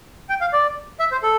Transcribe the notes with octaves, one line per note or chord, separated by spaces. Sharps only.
G5
F5
D5
E5
C5
A4